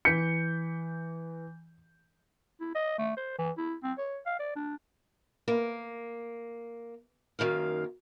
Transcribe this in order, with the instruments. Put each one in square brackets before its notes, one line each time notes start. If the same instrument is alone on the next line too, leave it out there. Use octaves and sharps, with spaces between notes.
[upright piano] E3 G6 [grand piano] B6 C#7
[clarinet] E4
D#5
A3
C5
E3
E4
C4
C#5
F5
D5
D4
[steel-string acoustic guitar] A#3
F#2 D#3 A#3 F5